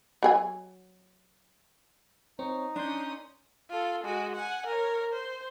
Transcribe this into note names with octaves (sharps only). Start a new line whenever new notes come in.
F#3 G#4 G#5
C4 D#4 C#5
C#4 D4 D5 C6 D#6 G6
F4 A4
G#3 F#4
F#5 G#5
A#4 C#5
C5